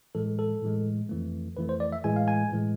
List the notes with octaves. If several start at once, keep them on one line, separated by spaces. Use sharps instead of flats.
A2 E3 G#3 A4
A4
A2 E3 G#3
F2 E3 A3
F2 E3 A3 B4
C5
D5
E5
A2 E3 G#3 G#5
F5
G#5
A2 E3 G#3